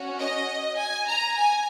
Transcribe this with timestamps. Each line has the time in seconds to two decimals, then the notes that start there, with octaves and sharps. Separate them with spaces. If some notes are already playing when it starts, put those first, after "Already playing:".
Already playing: C#4 F#4
0.19 D#5
0.80 G#5
1.09 A#5
1.38 G#5